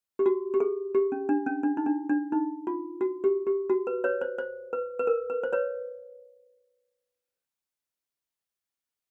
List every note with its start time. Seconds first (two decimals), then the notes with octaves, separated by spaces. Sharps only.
0.19 G4
0.26 F#4
0.54 G4
0.60 G#4
0.95 G4
1.12 C#4
1.29 D4
1.46 C#4
1.63 D4
1.77 D#4
1.86 D4
2.09 D4
2.32 D#4
2.67 F4
3.01 F#4
3.24 G4
3.47 G4
3.70 F#4
3.87 B4
4.04 B4 C#5
4.21 C5
4.38 C5
4.73 B4
4.99 B4
5.07 A#4
5.30 B4
5.43 C5
5.53 B4 C#5